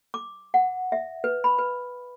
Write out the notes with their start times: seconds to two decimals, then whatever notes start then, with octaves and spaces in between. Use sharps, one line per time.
0.14 D6
0.54 F#5
0.92 E5
1.24 B4
1.44 B5
1.58 B4